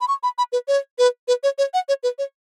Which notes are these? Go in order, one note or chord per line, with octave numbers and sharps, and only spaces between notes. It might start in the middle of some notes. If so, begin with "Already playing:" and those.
B5
C#6
B5
B5
B4
C#5
B4
B4
C#5
C#5
F#5
C#5
B4
C#5